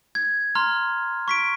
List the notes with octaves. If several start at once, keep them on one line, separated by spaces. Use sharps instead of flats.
G#6
A#5 C6 F6
C#6 B6 D7